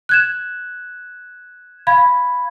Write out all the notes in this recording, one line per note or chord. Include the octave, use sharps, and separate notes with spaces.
F#6 G#6 E7
F5 B5 G#6